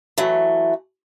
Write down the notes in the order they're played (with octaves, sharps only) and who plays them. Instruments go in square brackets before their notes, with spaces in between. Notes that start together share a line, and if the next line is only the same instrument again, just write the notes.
[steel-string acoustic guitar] E3 F#3 A3